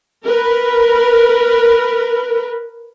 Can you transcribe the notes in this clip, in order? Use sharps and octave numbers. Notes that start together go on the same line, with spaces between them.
A#4 B4